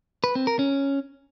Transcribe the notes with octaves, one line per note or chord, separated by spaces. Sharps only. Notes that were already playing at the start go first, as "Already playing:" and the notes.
B4
C4
A#4
C#4